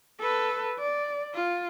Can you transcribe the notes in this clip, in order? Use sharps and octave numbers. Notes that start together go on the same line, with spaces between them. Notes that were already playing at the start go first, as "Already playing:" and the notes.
A4 B4
D5
F4